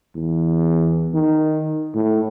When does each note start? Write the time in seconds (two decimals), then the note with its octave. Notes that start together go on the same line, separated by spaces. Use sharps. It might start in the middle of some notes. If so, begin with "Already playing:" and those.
0.15 E2
1.14 D#3
1.95 A2